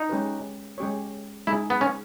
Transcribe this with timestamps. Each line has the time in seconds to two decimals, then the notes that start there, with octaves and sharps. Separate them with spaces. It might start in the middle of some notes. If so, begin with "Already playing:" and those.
Already playing: D#4
0.09 G#3 C#4 G4 B4
0.78 G#3 C#4 G4 C#5
1.47 G#3 D#4 E4 G#4
1.70 B3
1.81 C#4